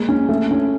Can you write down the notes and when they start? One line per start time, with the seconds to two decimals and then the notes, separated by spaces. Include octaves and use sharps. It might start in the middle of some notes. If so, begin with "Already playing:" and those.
Already playing: G#3 A#3
0.09 C#4
0.29 A3
0.51 C#4